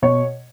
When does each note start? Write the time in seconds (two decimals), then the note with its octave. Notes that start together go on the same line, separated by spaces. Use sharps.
0.02 B2 C#5